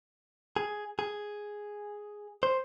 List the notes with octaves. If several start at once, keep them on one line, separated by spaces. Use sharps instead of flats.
G#4
G#4
C5